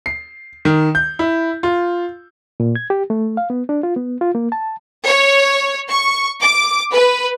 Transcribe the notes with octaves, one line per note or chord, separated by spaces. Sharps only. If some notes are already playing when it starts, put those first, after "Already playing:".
C7
D#3
G6
E4
F4
A#2
G#6
G4
A3
F5
B3
D4
F4
B3
F4
A#3
A5
C#5
C#6
D6
B4